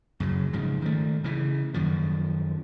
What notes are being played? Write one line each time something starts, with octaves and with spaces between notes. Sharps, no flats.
F#2 C#3 F#3
G#2 C#3 F3
D#3 A3
C#3 E3
F#2 D#3 F3